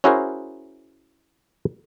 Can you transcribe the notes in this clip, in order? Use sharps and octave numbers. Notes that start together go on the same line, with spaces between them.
C#4 E4 F#4 G#4 A#4 C5